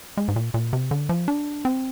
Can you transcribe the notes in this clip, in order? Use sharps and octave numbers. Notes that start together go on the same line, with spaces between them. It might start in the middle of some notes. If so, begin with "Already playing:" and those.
G#3
G#2
A#2
A#2
C3
D3
F3
D4
C4